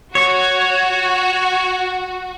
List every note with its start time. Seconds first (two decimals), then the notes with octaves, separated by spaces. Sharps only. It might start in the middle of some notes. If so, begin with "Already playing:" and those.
0.15 F#4 C#5